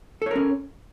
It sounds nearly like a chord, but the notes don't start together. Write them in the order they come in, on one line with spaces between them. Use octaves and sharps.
A4 C#5 A#4 C#4